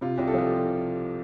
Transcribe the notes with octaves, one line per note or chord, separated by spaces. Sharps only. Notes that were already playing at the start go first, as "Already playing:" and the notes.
C3 F4
C2 G4
A4
F3 G4